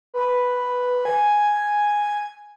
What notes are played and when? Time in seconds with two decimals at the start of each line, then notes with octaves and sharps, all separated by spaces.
0.14 B4
1.05 G#5